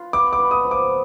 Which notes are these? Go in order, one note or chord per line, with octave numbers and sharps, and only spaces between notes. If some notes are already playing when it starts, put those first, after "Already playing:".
Already playing: F4 B4
B3 D6
D6
B4
D#6
F3
D6